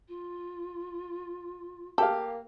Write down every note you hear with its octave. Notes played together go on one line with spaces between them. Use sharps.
F4
A#3 G4 A4 F5